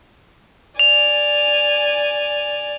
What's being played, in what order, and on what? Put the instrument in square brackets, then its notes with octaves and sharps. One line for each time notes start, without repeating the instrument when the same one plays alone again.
[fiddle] D5 G#5 [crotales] F7